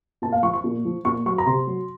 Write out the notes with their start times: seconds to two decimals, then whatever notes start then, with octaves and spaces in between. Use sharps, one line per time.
0.22 A#2 A5
0.32 F5
0.43 F3 C#6
0.53 C#6
0.64 A#2
0.85 F3
1.05 A#2 C#6
1.26 F#3 C#6
1.38 A#5
1.47 C3 C6
1.67 F#3